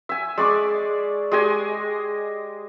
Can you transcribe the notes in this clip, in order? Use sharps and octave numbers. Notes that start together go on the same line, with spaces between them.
E5 G#5
G#3 D5 C#6 D6
G#3 G4 D#5 G#5